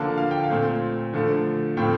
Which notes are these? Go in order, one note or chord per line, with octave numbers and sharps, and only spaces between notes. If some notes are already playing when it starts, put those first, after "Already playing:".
Already playing: D3 F3 A#3 A5
F5
G5
F5
A#2 A3 C4
D3 F3 A3
A2 F3 A3 C4 G5